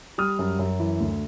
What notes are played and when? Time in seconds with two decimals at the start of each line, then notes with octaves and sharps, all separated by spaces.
0.18 G3 D#6 F6
0.39 F#2
0.59 F#2
0.79 E3
1.00 D2